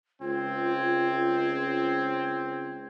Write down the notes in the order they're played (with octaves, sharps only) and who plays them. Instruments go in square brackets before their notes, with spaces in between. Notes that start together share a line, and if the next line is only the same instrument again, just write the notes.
[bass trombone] C#2 [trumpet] C4 [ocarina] F4 [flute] G#6